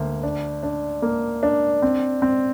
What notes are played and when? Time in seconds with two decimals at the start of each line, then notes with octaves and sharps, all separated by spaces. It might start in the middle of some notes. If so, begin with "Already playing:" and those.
Already playing: D2 A#3
0.23 D4
0.63 D4
1.02 A#3
1.43 D4
1.82 C4
2.22 C4